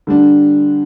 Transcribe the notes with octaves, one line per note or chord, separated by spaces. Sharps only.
D3 G3 D4